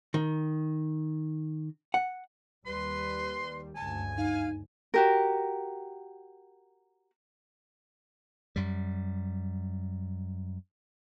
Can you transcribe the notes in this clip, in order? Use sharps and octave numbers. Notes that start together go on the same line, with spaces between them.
D#3
F#5
D#2 G3 B4 C6
F#1 D2 G2 G#5 A5
D#4 F5
F#4 G4 A#4
F#2 G3